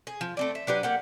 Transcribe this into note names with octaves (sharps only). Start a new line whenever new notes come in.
G#4
F3
A3 C4 D5
E5
F#3 D4 G4 B4
A#3 G4 F#5